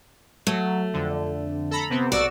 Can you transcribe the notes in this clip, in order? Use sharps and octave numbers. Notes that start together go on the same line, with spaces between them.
F#3 A3
F2 D3
A4 A#5 B5
C3 B3 C4
B1 F#4 D5 E6